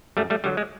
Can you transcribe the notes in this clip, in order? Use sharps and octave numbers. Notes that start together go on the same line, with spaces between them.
F#2 G3 A3
G3 A3
D3 F#3 G3
G#3